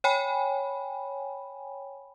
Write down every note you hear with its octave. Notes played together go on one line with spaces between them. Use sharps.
C#5 G5 G#5 B5